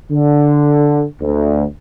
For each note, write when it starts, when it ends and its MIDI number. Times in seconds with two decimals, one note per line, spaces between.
0.11 1.06 50
1.22 1.64 38